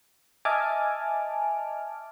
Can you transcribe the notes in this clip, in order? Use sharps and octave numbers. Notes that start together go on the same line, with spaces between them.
D#5 E5 G#5 A5 D6 F6